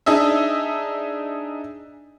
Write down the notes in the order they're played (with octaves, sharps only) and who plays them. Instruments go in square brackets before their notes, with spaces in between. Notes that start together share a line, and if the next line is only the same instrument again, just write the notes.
[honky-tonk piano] D4 D#4 G#4 D#5 E5